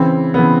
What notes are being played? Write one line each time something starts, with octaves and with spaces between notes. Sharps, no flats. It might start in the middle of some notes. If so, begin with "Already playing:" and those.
Already playing: C#3 E3 C4
C#3 E3 B3